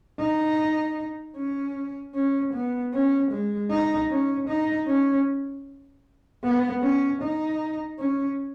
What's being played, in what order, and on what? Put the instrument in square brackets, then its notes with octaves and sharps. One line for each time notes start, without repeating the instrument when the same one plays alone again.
[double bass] D#4
C#4
C#4
B3
C#4
G#3
D#4
C#4
D#4
C#4
B3
C#4
D#4
C#4